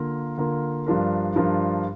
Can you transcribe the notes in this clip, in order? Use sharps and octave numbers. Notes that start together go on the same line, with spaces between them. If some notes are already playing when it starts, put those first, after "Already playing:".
Already playing: D3 A#3 F4 A#4
D3 A#3 F4 A#4
G2 F3 D4 F4 A#4
G2 F3 D4 F4 A#4